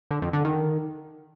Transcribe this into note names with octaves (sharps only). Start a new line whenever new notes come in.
D3
F2
D3
D#3